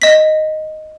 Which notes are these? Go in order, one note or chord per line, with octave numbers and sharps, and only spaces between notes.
D#5 B6